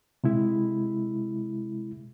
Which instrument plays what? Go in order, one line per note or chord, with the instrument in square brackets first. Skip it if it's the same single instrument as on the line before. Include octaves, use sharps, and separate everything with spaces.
[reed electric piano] C3 G#3 E4